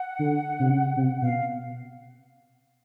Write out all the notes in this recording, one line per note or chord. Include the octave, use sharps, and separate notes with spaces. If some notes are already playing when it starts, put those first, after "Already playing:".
Already playing: F#5
D3
C3
C#3
C3
B2 F5